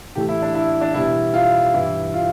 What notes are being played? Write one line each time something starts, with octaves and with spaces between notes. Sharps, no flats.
A2 E3 A3 G4
E4
D4
E4
D4
E2 B2 G3 E4
F4
G2 E3 G3 E4
F4